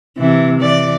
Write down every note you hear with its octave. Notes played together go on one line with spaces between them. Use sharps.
C3 E3
E3 D5